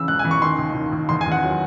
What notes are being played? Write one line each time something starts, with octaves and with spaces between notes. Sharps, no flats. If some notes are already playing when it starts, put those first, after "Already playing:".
Already playing: C#3 E3 E6
E1 F#6
G#5
E3
C#6
D#3 C6
D#2
D#2
D#2
E2 C6
G#5
E2
F#5
F#3